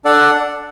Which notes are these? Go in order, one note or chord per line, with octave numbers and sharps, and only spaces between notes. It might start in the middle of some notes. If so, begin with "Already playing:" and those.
D4 A4 D5 F#5